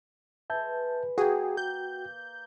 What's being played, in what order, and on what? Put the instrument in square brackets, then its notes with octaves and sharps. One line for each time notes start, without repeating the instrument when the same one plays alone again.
[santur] G#3 B4 [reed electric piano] E5 A5 G6
[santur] A#3 [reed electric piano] F#4 G5 [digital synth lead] G#4
[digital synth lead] G6